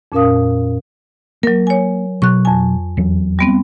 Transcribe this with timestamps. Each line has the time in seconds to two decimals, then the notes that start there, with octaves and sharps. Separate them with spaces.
0.12 F2 A#2 C#4 A#4 F5 D#6
1.43 F#3 A#3 A#4
1.67 C#5 G#5
2.22 B2 F#3 C#6 F#6
2.45 F2 G#5
2.97 E2 F#3
3.39 G3 B3 C4